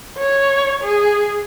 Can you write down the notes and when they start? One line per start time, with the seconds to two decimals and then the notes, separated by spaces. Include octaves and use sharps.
0.18 C#5
0.84 G#4